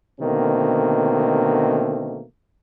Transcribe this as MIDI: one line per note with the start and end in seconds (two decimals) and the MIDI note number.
0.21 2.23 47
0.21 2.23 50
0.21 2.23 51
0.21 2.23 57
0.21 2.23 58
0.21 2.23 60